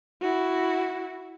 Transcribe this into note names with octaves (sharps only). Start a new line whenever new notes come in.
E4 F#4